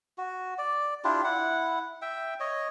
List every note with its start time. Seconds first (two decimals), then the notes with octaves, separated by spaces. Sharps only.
0.18 F#4
0.58 D5
1.04 D4 E4 F4 G4
1.24 E4 F#5
2.02 E5 G5
2.40 C#5 D#5